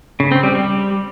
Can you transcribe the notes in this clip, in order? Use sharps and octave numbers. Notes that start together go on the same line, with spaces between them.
C#3
C4
G3
G3